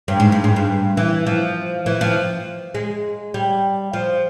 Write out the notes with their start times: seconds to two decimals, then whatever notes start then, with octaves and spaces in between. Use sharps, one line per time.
0.08 G2
0.20 G#2
0.32 G2
0.44 G#2
0.56 G2
0.97 E3
1.26 F3
1.86 E3
2.01 F3
2.75 G#3
3.34 G3
3.93 F3